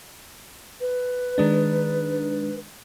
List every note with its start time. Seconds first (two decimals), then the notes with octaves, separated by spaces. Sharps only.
0.81 B4
1.38 D#3 G#3 D4